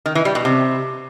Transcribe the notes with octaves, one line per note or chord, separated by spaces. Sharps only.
D#3
E3
G3
B2
C3